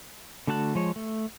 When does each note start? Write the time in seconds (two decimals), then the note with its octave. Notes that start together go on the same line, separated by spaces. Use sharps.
0.47 D3 A3 F#4 A5 F#6
0.75 F3 G#3 C#5
0.96 A3